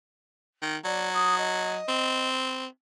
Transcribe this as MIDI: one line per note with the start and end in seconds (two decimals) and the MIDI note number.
0.63 0.77 51
0.85 1.78 54
0.85 1.09 74
1.13 1.37 87
1.38 2.29 75
1.89 2.67 60